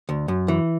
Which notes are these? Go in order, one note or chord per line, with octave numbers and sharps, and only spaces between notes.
D2
F#2
E3